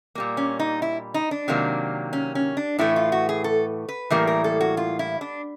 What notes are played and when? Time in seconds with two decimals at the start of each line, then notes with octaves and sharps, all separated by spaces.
0.15 A#2 G3 A#3
0.37 C#4
0.60 D#4
0.82 E4
1.14 D#4
1.31 D4
1.48 C3 D#3 F#3 A#3
2.13 C#4
2.35 C#4
2.57 D4
2.79 A2 E3 A3 E4
2.96 F4
3.12 F#4
3.29 G#4
3.44 A4
3.89 B4
4.10 A2 E3 G3 A#3 A#4
4.27 A#4
4.44 A4
4.61 F#4
4.77 F4
4.99 E4
5.21 D4